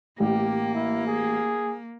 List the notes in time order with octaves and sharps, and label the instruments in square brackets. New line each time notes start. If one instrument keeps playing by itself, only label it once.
[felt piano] A1 [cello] A#3 [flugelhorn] G4
[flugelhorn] E4
G#4